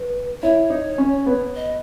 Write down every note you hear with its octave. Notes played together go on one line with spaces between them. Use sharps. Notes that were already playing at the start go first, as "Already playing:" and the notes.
Already playing: B4
E4 C#5
D#4
C#4
B3
D#5